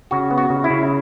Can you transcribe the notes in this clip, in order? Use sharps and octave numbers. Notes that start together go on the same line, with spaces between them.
C#3 F#4
B3
F#4
C#3
E4
C#3